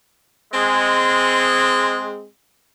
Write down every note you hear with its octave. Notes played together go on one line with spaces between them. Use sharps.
G#3 C4